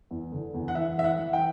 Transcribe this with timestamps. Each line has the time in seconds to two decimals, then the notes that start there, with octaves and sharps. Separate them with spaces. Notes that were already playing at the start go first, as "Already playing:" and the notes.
0.11 E2
0.32 D3
0.54 E2
0.68 F#5
0.75 E3 E5
0.98 E3 E5
1.04 F#5
1.19 E3
1.33 G5